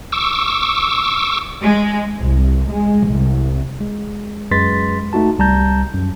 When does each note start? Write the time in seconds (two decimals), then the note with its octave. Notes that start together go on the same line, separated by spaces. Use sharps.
0.12 C#6 D6 E6
1.62 G#3
2.20 C2
2.71 G#3
3.09 C2
3.81 G#3
4.51 F#2 G#3 B4 C6 A6 B6
5.13 A3 D#4 F#4 A5
5.39 C2 G3 A5 A#5 G6
5.94 F#2